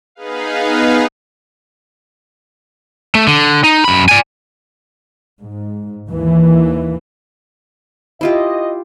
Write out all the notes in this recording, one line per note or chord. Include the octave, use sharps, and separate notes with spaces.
B3 D#4 G#4 B4 F5
A3
D3
D#4
F#2 B5
D5 G#5
G#2
D#2 E3
E4 F4 G4 D#5